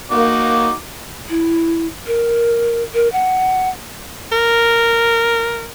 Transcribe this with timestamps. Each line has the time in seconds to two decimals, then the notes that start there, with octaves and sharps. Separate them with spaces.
0.11 A#3 D#4 F#4 D6
1.29 E4
2.07 A#4
2.94 A#4
3.13 F#5
4.32 A#4